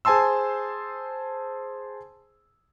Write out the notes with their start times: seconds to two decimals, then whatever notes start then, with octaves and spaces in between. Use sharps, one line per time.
0.05 G#4 C5 G#5 A5 C6 E6